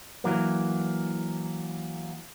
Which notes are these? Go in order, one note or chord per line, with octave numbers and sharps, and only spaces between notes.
E3 F#3 A#3